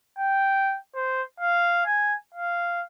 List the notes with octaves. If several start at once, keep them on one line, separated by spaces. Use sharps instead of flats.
G5
C5
F5
G#5
F5